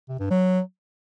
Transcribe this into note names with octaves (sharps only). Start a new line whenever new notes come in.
C3
G2
F#3